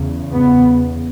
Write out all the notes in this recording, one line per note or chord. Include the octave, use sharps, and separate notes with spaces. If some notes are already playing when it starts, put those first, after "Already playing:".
Already playing: E2 C#3
B3